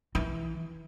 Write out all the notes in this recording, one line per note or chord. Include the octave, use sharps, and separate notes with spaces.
E3